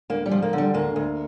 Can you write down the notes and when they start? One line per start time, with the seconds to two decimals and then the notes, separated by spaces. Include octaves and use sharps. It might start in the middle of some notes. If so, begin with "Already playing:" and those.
0.10 D2 A#3
0.26 G3
0.31 F3
0.42 A#3
0.53 D3
0.58 G3
0.74 D2 A#3
0.96 D2